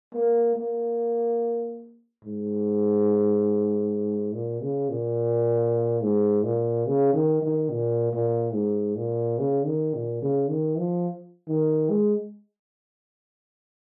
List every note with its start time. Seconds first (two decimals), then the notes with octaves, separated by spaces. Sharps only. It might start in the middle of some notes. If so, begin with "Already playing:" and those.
0.14 A#3
0.56 A#3
2.24 G#2
4.34 A#2
4.62 C#3
4.89 A#2
6.03 G#2
6.44 A#2
6.87 C#3
7.13 D#3
7.42 D#3
7.70 A#2
8.13 A#2
8.54 G#2
8.96 A#2
9.39 C#3
9.66 D#3
9.94 A#2
10.22 C#3
10.50 D#3
10.78 F3
11.48 D#3
11.90 G#3